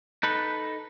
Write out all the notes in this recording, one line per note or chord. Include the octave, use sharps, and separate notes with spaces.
D#4 A4 B4